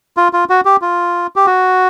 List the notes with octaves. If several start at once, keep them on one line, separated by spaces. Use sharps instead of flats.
F4
F4
F#4
G4
F4
G4
F#4